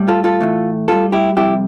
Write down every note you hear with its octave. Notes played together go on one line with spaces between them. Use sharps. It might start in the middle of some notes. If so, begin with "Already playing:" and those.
Already playing: A2 G3
F4 A4
F4 A4
A2 E3 A3
A2 G3 F4 A4
E4 G4
F2 C3 G3 E4 G4